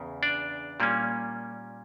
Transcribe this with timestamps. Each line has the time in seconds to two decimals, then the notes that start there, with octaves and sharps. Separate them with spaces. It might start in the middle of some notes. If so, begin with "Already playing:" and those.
Already playing: E2 C#3
0.23 D4 D5
0.80 A#2 G3 A#3 C#4